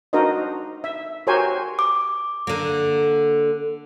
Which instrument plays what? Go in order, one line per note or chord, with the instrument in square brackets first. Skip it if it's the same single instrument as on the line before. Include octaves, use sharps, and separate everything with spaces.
[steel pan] D4 D#4 F#4 A#4 C5 D#5
E5
F#4 G4 A#4 C5 C#5 G#5
[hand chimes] D6
[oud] D3 A#3